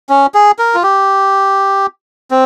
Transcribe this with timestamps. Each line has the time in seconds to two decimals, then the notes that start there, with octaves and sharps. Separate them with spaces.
0.09 C#4
0.34 G#4
0.59 A#4
0.75 F4
0.83 G4
2.31 C4